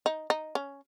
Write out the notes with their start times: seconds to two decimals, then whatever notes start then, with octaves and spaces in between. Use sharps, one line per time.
0.06 D#4
0.30 D#4
0.55 C#4